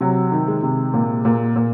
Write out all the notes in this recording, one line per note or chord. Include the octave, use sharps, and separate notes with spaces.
C3 F#3
D#3
G#3
C3
A#2
A#2
A#2